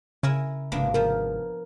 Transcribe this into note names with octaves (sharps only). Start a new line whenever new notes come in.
C#3 E4 A#4 G#5
G#1 C3 A#3 B3 D4
F3 B3 A#4